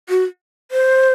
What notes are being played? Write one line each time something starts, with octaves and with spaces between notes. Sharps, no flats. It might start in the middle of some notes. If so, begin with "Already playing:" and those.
F#4
C5